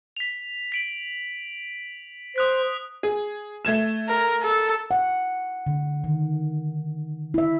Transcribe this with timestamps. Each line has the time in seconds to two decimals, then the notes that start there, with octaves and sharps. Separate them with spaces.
0.17 B6 F7
0.72 B6 D7 F#7
2.36 C5 D#6 F#6 B6
3.03 G#4
3.65 A3 G#6 E7
4.08 A#4
4.42 A4
4.91 F#5
5.67 D3
6.04 D#3
7.34 E4 E5